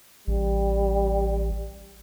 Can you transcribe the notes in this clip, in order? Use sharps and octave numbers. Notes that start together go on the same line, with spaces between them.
A1 G3